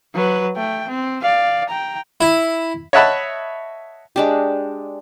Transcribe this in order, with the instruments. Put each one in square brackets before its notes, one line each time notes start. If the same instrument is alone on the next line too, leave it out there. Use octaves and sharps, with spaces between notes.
[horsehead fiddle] F#3 B4
A3 G5
C4
D5 F5
G5 A#5
[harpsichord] E4
[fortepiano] C#5 D#5 E5 F#5 A5 B5
[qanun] G#3 D4 G4